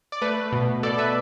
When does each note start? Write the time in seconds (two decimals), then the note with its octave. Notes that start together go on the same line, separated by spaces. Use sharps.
0.12 D5
0.22 A3 B4
0.52 B2
0.83 B2 A4 D5
0.98 B4 E5